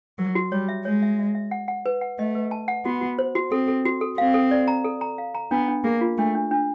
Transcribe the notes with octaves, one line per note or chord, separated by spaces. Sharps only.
F#3 A#4
F#4
G3 C#5
E5
G#3 C#5
E5
E5
E5
F#5
F#5
B4
F#5
A3 D#5
B4
A5
F#5
B3 F#4
F#4
C5
F#4
C4 A4
A4
F#4
A4
C4 F5
A4
D5
A#5
A4
A#5
F5
A#5
B3 D4
D4
A#3 G#4
F4
A3 D4
D4
D4